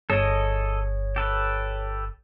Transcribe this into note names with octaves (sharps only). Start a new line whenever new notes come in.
G1 G#4 A4 C#5 D#5
G4 A4 B4